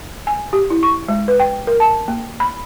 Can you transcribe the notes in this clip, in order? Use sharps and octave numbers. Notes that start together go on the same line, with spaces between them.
G#5
G4
E4
C#6
G#3
B4
G5
A#4
A5
A#3
B5